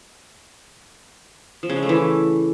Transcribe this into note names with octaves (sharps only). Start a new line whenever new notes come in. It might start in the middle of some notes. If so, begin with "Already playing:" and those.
F3
C#3
G#3
A3
E3